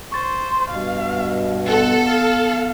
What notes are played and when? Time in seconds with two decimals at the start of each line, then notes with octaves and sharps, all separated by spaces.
0.12 C5 C#6 A6
0.70 G2 B2 F5
1.67 B3 A4 F#5
2.06 F5